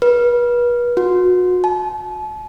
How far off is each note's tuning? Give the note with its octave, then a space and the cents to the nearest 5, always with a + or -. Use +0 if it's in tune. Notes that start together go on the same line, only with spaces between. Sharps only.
B4 -35
F#4 -35
A5 -40